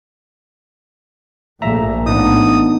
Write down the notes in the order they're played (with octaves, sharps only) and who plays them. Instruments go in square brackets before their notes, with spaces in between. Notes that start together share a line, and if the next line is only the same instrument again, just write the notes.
[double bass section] A#1 A#2 A3 [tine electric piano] E5 A#5
[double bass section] A1 [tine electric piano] B3 D4 D#4 [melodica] D#6